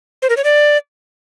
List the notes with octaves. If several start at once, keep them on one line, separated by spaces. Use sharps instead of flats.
C5
A#4
C#5
D5